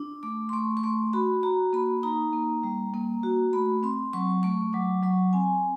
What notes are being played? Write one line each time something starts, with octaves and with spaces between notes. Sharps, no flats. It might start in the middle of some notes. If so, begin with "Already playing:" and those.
Already playing: D4
A3 D6
C6
A3 C#6
C#6
A3 C6
F#4 B5
F#4 A#5
A#3 B5
D#4 A#5
A#3
G3
A#3
F#4
A3 B5
C4 C6
F#3 C#6
A3 C#6
F#3 D6
F#3 C#6
C4 G#5